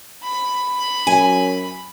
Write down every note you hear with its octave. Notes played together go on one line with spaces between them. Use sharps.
B5
F#2 G#5